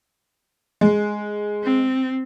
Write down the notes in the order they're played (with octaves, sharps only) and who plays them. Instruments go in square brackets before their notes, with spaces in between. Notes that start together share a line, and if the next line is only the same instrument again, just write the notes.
[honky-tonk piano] G#3
[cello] C4